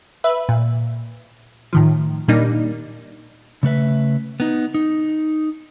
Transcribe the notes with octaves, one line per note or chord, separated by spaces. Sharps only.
B4 E5
A#2
A2 D#3 F3
A#2 G3 A#3 D4 D#4
C#3 A3 B4 E5
B3 D#4
D#4